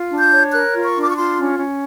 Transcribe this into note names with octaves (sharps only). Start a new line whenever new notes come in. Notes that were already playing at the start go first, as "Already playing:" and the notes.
Already playing: F4
D4
G6
C#5
A#4 F#6
F4
C#6
D4
D6
C#6
F4 C6
C#4
C#4